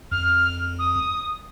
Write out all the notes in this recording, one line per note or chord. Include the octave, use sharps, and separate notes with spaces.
F2 F6
D#6